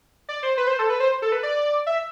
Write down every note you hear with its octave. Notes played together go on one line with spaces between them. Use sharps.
D5
C5
B4
C5
A4
B4
C5
A4
B4
D5
E5